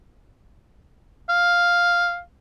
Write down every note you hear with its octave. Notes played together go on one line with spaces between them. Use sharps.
F5